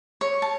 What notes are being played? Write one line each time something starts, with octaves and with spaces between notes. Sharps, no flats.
C#5
A5